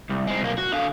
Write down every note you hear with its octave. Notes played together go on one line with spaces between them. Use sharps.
C2
G#3 C4
B1 A#3
F#4
D3 F5